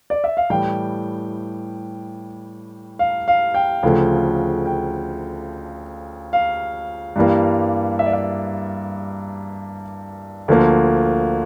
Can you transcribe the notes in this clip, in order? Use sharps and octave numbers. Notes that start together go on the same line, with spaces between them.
D5
E5
F5
A2 E3 G3 G5
F5
F5
G5
D2 C#3 F3 A3
G5
F5
G2 E3 G3 A#3
E5
D5
E5
D2 D3 F3 A#3